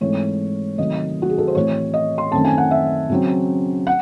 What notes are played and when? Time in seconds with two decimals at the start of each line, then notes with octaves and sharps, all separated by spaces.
0.01 G#2 E3 A3 C4 C#5
0.78 C3 D#3 F#3 A3 C4 D#5
1.22 F#4
1.29 G#4
1.38 A4
1.47 C5
1.55 A2 E3 C4 C#5
1.94 D#5
2.18 C6
2.32 F#2 D#3 A3 C4 A5
2.45 G#5
2.58 F#5
2.71 E5
3.10 C#3 F#3 C4
3.87 F#5